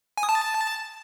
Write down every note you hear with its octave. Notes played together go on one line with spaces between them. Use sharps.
G#5
D#6
A5